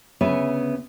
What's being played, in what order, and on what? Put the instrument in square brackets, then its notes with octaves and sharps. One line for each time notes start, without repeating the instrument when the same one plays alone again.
[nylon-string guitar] D2 C#3 B3 C#5 E5 G#5